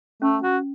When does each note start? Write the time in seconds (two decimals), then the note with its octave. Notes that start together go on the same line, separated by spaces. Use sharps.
0.22 A3 C#4
0.43 F#4